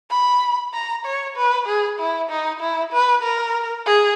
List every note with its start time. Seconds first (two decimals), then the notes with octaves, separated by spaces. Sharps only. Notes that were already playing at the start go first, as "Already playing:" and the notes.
0.11 B5
0.74 A#5
1.05 C#5
1.36 B4
1.67 G#4
1.99 E4
2.30 D#4
2.61 E4
2.93 B4
3.23 A#4
3.86 G#4